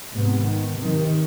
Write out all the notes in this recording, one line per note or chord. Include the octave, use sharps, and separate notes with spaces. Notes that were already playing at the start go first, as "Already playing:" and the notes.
G#2 C3 B3
D#3
C3 D#3